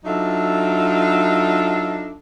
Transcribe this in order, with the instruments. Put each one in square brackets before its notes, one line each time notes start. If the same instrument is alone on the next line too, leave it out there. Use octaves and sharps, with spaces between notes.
[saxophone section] F#3 D4 D#4 F4 A4 E5